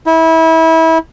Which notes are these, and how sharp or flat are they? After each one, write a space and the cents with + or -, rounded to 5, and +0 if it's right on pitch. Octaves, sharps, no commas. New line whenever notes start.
E4 -25